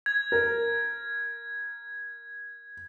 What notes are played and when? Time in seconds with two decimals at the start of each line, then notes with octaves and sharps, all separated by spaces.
0.06 G#6
0.32 A#4